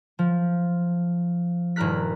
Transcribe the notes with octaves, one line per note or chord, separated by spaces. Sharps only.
F3
D#1 G2 E4 A#4 F#6 B6